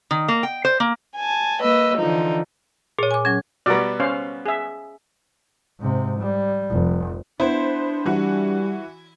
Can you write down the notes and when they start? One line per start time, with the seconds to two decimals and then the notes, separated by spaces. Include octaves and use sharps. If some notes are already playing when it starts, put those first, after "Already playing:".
0.11 D#3
0.28 A#3
0.43 G5
0.65 C5
0.80 A#3
1.16 G#5 A5
1.60 A#3 B4 D#5 E6
1.99 D3 E3 F3 D#4
2.99 A#2 G#4 C#5
3.11 G#5 D6
3.25 F#3 C#4 G#6
3.66 B2 G3 B3 D5 A#5
4.00 C#4 C5 F5
4.46 G#4 E5
5.80 G#2 C3
6.20 G3
6.70 F1
7.40 B3 D4 E4 C5
8.06 E3 G3 F#4